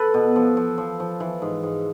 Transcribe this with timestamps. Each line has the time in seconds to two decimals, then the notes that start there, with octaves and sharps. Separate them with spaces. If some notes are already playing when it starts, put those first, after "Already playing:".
Already playing: A4 B4
0.14 B2
0.36 F3
0.57 F3
0.78 F3
1.00 F3
1.20 E3
1.42 G#2
1.63 G#2